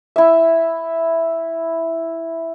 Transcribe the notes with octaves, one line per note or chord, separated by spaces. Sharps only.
E4 E5